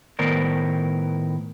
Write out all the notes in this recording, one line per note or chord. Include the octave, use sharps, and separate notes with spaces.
A2 D#3 B3 A#4 C5 D5